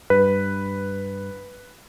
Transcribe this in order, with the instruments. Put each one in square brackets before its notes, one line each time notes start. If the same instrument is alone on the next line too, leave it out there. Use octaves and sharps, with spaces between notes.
[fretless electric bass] G2 [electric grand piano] B4